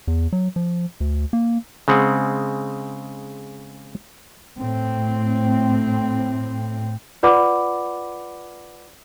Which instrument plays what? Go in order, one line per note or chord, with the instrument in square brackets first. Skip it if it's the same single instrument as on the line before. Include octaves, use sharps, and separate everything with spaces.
[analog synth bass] E2
F#3
F3
D2
A#3
[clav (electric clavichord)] C#3 G#3 C4 F#5
[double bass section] A2 C4
[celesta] F4 B4 D5 F#5 B5 D6